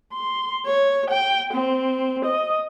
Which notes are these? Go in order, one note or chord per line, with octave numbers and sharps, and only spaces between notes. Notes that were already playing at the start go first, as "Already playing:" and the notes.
C6
C#5
G5
C4
D#5